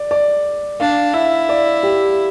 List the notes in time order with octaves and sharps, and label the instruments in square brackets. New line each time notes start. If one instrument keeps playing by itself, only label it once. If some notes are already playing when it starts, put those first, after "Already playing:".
Already playing: [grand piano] D5
D5
[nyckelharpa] D4 [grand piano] F5
[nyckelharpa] E4 [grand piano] E5
[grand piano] D5
G4